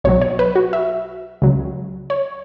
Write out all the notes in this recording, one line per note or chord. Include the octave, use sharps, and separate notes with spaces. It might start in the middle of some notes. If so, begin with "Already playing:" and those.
B1 B2 F#3 C#5
C#5
B4
F#4
E5
C#2 C#3 F#3
C#5